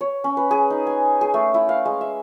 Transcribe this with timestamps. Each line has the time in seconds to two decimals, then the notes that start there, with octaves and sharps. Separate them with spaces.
0.01 C#5
0.24 C#4
0.37 B4
0.51 G#4
0.70 D#4
0.87 G#5
1.21 G#4
1.34 A3
1.54 E4
1.69 F5
1.85 G#3
2.01 E5